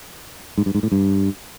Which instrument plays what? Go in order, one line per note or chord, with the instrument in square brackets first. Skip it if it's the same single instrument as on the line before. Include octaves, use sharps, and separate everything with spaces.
[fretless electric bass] G#2
G2
G#2
A2
G2